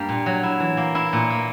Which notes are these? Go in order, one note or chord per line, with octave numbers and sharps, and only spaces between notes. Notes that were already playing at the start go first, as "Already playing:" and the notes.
Already playing: G2 G3 A#3
A#2
F#3
E4
E3
A#3
E4
A#2
A#3